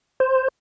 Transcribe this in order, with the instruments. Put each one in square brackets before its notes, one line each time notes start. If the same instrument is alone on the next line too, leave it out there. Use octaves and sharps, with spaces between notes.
[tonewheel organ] C5